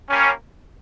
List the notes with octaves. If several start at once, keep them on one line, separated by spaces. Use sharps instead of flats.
G3 A#3 C#4